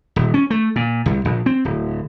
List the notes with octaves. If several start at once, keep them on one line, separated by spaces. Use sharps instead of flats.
D#1
C#4
A3
A#2
C2
A#1
C4
D1